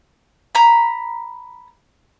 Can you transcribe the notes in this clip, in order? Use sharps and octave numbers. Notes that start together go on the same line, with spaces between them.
A#5 B5